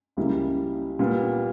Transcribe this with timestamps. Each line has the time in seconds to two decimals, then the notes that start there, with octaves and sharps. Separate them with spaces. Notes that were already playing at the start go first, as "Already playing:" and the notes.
0.17 C#2 C#3 G3 A#3 E4
0.99 A#2 G3 B3